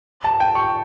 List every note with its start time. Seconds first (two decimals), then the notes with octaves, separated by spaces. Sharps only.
0.24 A5
0.40 G5
0.55 C#6